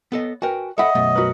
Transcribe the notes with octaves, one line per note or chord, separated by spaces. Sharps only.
B3 A4 D#5
F#4 A#4 B4 G5 G#5
A4 D#5 E5 F#5 B5
B1 F#2 A3
F#4 A#4 B4